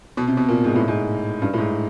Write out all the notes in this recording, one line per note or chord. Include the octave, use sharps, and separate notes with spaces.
B2
C3
B2
A#2
G#2
A2
G#2
G2
A2
G#2